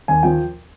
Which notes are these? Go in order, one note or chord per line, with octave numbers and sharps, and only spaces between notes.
D#2 G#5
F3 G5